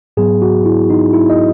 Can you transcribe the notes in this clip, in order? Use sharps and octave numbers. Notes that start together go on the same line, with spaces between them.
G#2 F#3 B3 G#4
F#4
E4
D#4
E4
D#5